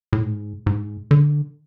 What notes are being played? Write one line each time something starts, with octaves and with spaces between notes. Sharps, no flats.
A2
G#2
G#2
D3